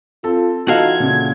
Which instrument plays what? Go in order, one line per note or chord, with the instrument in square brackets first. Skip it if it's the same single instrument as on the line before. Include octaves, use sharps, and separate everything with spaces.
[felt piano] C4 A4 [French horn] F4
[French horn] E3 [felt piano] D#4 F4 [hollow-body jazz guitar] F#4 A4 F5 [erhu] G#6
[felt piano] A#2 C#3